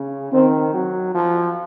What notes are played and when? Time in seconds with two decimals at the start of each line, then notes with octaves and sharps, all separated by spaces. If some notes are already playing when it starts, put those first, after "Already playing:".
Already playing: C#3
0.33 D#3 C4
0.74 F#3
1.14 F3